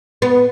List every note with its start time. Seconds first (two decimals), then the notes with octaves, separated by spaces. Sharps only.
0.22 B3